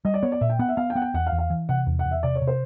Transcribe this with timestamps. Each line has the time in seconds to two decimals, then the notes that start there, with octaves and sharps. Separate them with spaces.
0.05 G3 D#5
0.14 D5
0.23 B3 C#5
0.32 D5
0.41 A#2 E5
0.50 G5
0.59 B3 F#5
0.69 E5
0.77 B3 F5
0.90 G5
0.95 B3 F#5
1.02 G5
1.14 E2 F#5
1.27 F5
1.32 E2
1.38 F5
1.50 E3
1.69 C3 F#5
1.87 E2
1.99 F#5
2.05 E2
2.11 E5
2.23 C3 D5
2.35 C#5
2.42 C3
2.47 C5